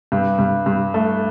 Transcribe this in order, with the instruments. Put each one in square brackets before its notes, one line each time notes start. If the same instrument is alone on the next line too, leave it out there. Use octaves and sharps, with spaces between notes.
[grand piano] G2
G2
G2
A3